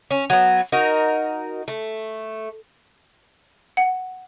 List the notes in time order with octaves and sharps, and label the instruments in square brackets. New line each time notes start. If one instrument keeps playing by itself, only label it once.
[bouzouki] C#4
F#3 B3
D#4 F#4 A#4
A3
[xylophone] F#5